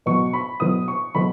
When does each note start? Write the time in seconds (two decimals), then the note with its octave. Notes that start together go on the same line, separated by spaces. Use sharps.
0.06 B2 F#3 B3 C#6
0.33 B5
0.60 B2 F#3 B3 D#6
0.88 C#6
1.15 B2 F#3 B3 B5